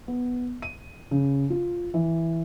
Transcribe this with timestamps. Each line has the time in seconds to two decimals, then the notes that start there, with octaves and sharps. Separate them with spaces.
0.08 B3
0.62 D#7
1.11 C#3
1.50 F4
1.94 E3